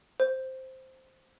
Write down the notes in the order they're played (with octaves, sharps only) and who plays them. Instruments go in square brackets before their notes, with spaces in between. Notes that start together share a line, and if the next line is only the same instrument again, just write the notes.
[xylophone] C5